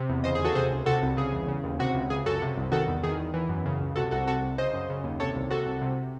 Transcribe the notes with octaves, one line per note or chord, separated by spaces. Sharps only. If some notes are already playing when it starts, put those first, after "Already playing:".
Already playing: C3
E2
C#3 C5 D#5
G#4
D#2
F#4 A4
C3 G#4 C5
C#2
C3 F#4 A4
C2
C#3 G#4
E2
C#3
D#2
C3 F#4
C#2
C#3 G#4
F#2 F#4 A4
C3
C2
D#3 F#4 A4
E2
D#3 G#4
E2
E3
F#2
C#3
C#2
C3 F#4 A4
C2 F#4 A4
C3 F#4 A4
C2
C#3 C5 D#5
F#2
C#3
D#2
C3 A4 C#5
C2
C3 F#4 A4
C2
C3